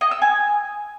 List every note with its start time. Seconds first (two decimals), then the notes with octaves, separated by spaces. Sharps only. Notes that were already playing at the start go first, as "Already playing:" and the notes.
0.01 D#5
0.11 E6
0.22 G#5